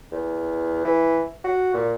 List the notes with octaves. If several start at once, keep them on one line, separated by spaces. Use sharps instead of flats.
E2
E3
F#4
A#2